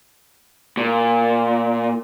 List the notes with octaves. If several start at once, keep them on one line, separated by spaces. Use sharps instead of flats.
A#2